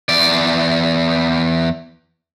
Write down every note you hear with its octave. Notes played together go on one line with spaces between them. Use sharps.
E2 D5